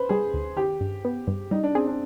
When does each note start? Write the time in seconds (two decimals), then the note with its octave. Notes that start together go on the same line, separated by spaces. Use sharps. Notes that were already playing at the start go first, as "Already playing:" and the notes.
Already playing: B4 C5
0.09 G3 G#4
0.34 D2
0.56 D#3 G4
0.81 G2
1.05 B3
1.27 G2
1.51 G3 D#4
1.63 D4
1.75 C4 G#4
1.87 D4